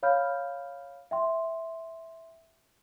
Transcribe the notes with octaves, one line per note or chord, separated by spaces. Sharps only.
C#5 F5 B5 F6 G6
E5 G5 C6